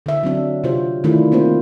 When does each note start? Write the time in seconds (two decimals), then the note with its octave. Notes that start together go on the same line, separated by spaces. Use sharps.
0.06 D3 E5
0.23 F#3 C4 D4
0.64 C3 F4 C5
1.04 D#3 A3 D4 E4 F4
1.32 A#3 C4 F4 C5